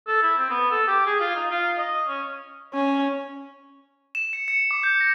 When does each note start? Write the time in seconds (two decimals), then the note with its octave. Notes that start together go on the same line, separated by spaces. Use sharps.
0.07 A4
0.22 E4
0.38 C4
0.50 B3
0.71 A4
0.87 G4
1.06 G#4
1.20 F4
1.35 D#4
1.50 F4
1.77 D#5
2.08 C#4
2.74 C#4
4.15 E7
4.33 C#7
4.48 C#7
4.71 D6
4.83 G6
5.01 A#6